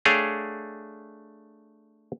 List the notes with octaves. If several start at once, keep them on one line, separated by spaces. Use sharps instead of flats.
A3 D4 G#4 C#5 F5 G5